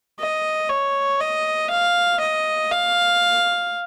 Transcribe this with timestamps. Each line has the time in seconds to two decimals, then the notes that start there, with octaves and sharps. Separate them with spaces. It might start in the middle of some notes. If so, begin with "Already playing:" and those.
0.20 D#5
0.70 C#5
1.20 D#5
1.70 F5
2.20 D#5
2.71 F5